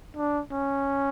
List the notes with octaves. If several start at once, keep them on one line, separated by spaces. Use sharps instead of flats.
D4
C#4